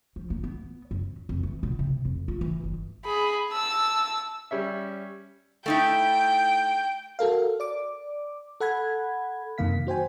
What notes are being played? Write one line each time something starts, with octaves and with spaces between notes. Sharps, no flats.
F3
A#3
B3
F#2
F2
E3
B2
C3
F2
F4
E3
G1
G#4 B5
A5 E6
G3 C#4 E5
A3 D#4 E4 G5
F#4 A4 A#4 F5
D5 D6
A4 F#5 B5 G#6
F#2 C3 D#3 A#3 F5 B6
F#4 C5 G5 G#5